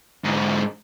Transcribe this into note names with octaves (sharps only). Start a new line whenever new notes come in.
G#2 D3